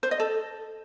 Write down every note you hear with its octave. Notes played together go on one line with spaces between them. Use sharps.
C5
D#5
A4